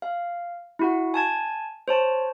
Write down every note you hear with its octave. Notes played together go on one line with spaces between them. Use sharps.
F5
E4 F#4 F#5
G#5 A5 G#6
C5 C#5 A5